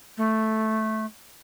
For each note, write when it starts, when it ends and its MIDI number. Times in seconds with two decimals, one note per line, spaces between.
0.17 1.05 57